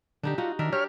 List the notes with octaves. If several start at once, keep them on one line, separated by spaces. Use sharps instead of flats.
D3 D4 D#4 G4
D#4 F4 F#4
D#3 D4 A#4 E5
G4 C#5 F6